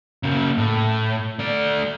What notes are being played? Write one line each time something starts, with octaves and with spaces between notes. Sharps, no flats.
C#3 A#3
A2
A3 D5